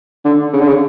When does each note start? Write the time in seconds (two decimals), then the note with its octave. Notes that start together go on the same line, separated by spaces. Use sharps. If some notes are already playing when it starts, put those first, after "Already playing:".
0.25 D3
0.53 C#3
0.61 D3
0.68 C#3